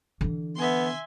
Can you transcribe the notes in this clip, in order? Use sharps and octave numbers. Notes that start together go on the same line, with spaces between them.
D3 E3
B3 E5 G#5 C6